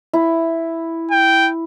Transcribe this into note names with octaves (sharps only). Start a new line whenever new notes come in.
E4
G5